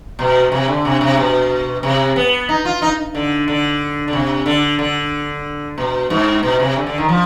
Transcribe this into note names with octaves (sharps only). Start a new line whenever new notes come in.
B2
C3
D3
C3
C3
B2
C3
B3
D#4
F4
D#4
D3
D3
D3
C3
D3
D3
B2
G#2
B2
C3
D3
D3
D#3
F3